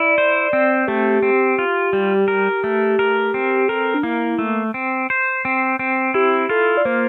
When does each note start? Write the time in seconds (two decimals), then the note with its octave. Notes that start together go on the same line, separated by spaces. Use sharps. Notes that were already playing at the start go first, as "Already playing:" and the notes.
Already playing: E4 D5
0.18 C5
0.53 C4
0.88 A3 G4
1.23 C4
1.59 F4
1.93 G3
2.28 A#4
2.64 A3
2.99 A#4
3.34 C4
3.68 A4 A#4
3.94 D4
4.03 A#3 E4
4.39 A3
4.74 C4
5.10 C5
5.45 C4
5.79 C4
6.14 E4 G4
6.49 F4 A4
6.77 D5
6.85 A#3 C5